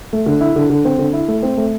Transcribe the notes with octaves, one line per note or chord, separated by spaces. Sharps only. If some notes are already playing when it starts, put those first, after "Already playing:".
A3
D3
E4
D3
D3
C4
D3
E4
A3
C4
A3